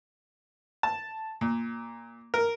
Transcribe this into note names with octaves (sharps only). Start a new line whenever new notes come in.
A5
A#2
A#4